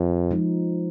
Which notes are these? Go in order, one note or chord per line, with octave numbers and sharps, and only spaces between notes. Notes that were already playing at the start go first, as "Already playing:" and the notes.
Already playing: F2
F3 G#3 D#4